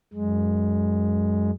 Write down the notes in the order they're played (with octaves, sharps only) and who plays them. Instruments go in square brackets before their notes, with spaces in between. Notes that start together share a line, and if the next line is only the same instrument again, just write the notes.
[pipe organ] F#2 G#3